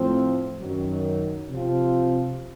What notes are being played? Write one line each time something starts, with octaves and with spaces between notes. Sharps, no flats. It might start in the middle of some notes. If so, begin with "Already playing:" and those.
Already playing: A2 F3 C4
F#2 D#3 F#3
C3 F3 C4 F4